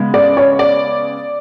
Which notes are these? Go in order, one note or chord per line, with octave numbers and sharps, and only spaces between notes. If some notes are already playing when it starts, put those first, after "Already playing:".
Already playing: C#3 G#3 B3
D5
C#5
D5